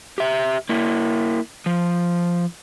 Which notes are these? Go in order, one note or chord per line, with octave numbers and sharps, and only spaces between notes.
G4 E5
A#3 E4
F3